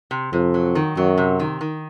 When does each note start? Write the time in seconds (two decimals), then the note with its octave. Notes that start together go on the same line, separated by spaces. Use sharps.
0.11 C3
0.33 F2 C3
0.54 F#3
0.75 D#3
0.97 F#2 F#3
1.18 C3
1.40 D#3
1.61 D#3